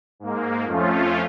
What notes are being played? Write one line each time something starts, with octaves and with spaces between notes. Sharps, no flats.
G#2 A#3
F2 F3 A3 C#4 F4